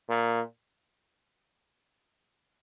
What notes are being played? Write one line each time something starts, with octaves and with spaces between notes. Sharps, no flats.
A#2